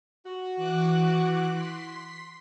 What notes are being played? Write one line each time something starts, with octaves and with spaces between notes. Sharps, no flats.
F#4
E3 D6 F#6
C6 B6